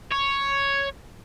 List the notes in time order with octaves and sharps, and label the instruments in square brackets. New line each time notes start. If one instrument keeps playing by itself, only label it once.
[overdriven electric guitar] C#5